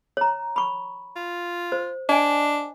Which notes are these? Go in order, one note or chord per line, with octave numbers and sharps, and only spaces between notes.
C#5 A#5
B5 C#6
F4
C5
D4 D#5 G#5